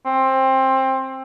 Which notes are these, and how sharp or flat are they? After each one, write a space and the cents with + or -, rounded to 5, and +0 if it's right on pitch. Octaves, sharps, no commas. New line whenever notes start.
C4 +20